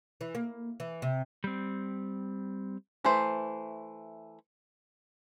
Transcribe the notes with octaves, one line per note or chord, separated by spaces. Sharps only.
E3
A#3
E3
C3
G3 C4
E3 A3 C5